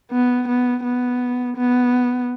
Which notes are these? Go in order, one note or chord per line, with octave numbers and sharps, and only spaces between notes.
B3
B3
B3
B3